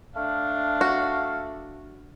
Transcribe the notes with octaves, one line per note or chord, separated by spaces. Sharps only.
A3 D4 F5
F#4